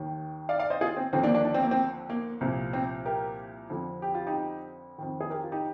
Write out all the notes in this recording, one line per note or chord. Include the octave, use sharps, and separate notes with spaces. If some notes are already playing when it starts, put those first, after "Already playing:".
Already playing: D#2 D#3
D5 F5
D5 F5
C5 D#5
F4 G#4
C4
D#2 D3 F3 C4
A#3 D4
A#3 D4
D4
C4
A#3
C4
A#3
C2 A#2 F3
C4
G4 A#4
F2 D3 F3
G4
F4
D#4 G4
F2 D#3
G#4
G4 A#4
F4
D#4 G4